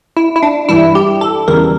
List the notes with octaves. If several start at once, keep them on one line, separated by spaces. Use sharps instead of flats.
E4
E4
D4
G2 E3 G3 E4
G4
A4
E2 C#3 E3 G3 A#4